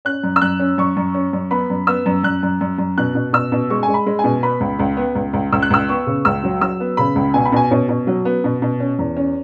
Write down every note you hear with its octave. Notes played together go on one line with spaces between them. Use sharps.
C#4 F#6
F#2
E6
F#2 F#6
C#4
F#2 C#6
F#2
C#4
F#2
B3 B5
F#2
B3 E6
F#2
F#2 F#6
F#2
F#2
F#2
B2 F#6
B2
B2 E6
B2
G#3 C#6
G#5
G#3
B5
G#3
G#5
B2
B3 B5
C#2
C#2
B3
C#2
C#2
C#2 E6
F#6
C#2 E6
B3 C#6
C#3
C#2 E6
F#3
F#3 E6
B3
C#3 B5
C#2
B2 G#5
B5
B2 G#5
B2 C#5
B2
F#3
B3
B2
B2
C#4
E2
C#4